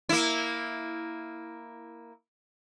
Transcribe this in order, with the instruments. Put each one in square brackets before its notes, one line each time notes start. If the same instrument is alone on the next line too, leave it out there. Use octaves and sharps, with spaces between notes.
[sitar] A#3 E4